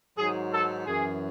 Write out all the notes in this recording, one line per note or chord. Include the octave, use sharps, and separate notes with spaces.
G#2 D#3 F#3 G#4
A4
F#2 E3 G#4